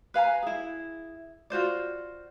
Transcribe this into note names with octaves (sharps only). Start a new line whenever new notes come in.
B4 F5 G#5 A#5
E4 G#4
F4 F#4 C5 D5